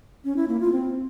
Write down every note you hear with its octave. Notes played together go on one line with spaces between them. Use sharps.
C#4
E4
A#3
F4
C4